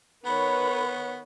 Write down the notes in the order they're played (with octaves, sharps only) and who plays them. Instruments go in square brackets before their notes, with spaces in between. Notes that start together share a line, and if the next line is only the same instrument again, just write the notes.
[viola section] D#3 B4 C#5 [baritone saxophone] B3 [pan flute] B5